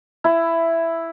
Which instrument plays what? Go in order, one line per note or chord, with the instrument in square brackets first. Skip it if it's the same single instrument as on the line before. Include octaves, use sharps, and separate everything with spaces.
[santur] E4